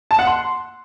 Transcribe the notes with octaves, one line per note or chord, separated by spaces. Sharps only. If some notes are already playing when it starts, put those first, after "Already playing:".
A5
F#5
C6